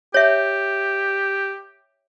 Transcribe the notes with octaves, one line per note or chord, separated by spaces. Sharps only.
G4 C#5 E5